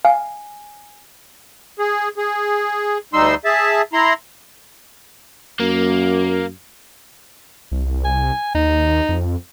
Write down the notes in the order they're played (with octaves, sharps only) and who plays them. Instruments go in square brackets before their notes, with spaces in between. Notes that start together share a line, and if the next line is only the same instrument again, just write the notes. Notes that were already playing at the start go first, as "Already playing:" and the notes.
[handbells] F5 [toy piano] G#5
[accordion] G#4
G#4
D2 G3 D#4 C6 E6
G#4 E5 A5
E4 A#5 C6
[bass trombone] F#2 [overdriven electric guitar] A#3
[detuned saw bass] C2
[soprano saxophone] G#5
[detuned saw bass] D#2 [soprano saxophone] D#4
[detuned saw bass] F2